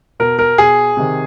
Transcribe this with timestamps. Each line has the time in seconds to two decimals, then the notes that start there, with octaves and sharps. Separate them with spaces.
0.20 B2 A#4
0.39 A#4
0.58 B2 G#4
0.97 C3 D#3